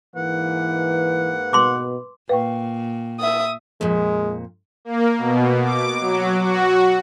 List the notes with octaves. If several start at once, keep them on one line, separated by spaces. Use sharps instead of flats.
G#2 E3 A#3 B4 F#5
B2 C6 D6
A#2 B4 F5 G5 C#6
E5 D#6
F2 A#2 G#3
A#3
B2
D6
F#3
F#4